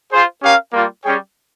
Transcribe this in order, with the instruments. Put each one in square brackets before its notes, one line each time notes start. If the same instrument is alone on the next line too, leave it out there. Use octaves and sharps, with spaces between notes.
[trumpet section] F4 G#4 C5
C#4 G4 A#4 F5
G3 A#3 F4
G3 C#4 G#4 C#5 G5